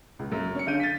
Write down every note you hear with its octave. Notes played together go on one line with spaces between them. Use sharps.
C#2
F#2
C#4 C#7
D3 F5 G6 D#7
A6 B6